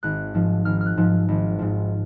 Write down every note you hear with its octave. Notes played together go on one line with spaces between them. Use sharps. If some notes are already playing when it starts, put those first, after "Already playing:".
G#1 F#6
G#2 F3
G#1 F6
F6
F#6
G#2 F3
G#1
G#2 F3